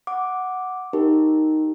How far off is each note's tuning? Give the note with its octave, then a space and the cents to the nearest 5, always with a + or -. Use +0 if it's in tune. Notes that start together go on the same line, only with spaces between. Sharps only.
F#5 +0 D6 +0
D#4 +0 G4 +0 A#4 +0